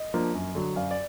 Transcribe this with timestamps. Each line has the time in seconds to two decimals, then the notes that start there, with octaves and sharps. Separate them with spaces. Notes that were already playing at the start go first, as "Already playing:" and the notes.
Already playing: D#5
0.14 F3 A#3 D4
0.34 F#2
0.55 D3 F#3
0.76 F#2 D5 F5
0.91 D5